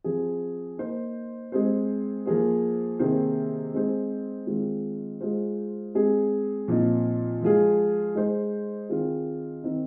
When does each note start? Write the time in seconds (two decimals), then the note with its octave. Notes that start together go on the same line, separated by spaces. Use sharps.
0.04 F3 C4 G#4
0.78 A#3 D#4 C5
1.52 G#3 C4 G#4 C5
2.26 F3 A#3 G#4 C5
2.99 C3 D#3 A#3 G#4 C5
3.74 G#3 C4 D#4 G#4 C5
4.47 D#3 G#3 C4 F4
5.21 G#3 F4 C5
5.95 G#3 C4 G#4
6.68 A#2 F3 C4 D#4
7.42 F3 G#3 F4 G#4
8.15 G#3 D#4 C5
8.89 D#3 C4 F4 G#4
9.64 D#3 C4 D#4